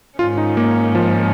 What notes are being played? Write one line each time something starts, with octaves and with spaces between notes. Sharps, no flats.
G#2 D#3 C#4 F4
D#4
A#3
F3